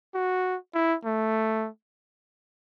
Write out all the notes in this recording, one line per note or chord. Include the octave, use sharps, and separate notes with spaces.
F#4
E4
A3